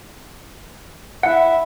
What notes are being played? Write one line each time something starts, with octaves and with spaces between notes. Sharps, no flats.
E4 E5 F#5